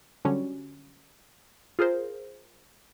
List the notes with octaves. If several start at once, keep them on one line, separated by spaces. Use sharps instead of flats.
D3 F#3 G3 C#4
F4 G#4 A#4 C5